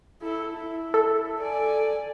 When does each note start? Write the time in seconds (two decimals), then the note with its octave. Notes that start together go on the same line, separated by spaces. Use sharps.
0.21 E4 A4
0.52 E4
0.94 A4
1.40 D5 G#5